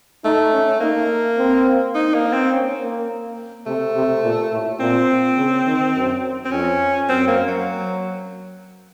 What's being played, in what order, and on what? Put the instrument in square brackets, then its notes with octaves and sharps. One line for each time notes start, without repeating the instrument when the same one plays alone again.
[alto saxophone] A3 [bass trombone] D#4
[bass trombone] C#4
[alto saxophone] A#3 [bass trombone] D#4
[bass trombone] C4
[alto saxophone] D#4
A#3
C4
[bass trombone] C#4
A#3
[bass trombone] C3 [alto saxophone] A3
[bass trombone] C3
A#2
A2
[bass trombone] A#2 [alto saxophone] C4
[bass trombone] C#3
D#3
F#2
[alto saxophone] C4
[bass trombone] F2 [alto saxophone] C#4
[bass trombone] F#2 [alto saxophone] C4
[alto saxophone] A#3
F#3